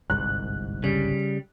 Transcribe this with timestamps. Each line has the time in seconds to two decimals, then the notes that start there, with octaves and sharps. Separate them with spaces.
0.10 G1 C2 G#2 F#6
0.84 C#3 G3